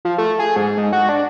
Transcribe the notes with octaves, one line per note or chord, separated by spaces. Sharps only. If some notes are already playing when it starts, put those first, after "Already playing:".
F3
A3
G#4
G#2
G#2
F#4
D4